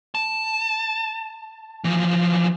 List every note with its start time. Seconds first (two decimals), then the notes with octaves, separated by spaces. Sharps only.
0.15 A5
1.84 E3 F3